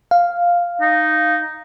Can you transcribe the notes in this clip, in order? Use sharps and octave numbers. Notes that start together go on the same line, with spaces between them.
F5
D#4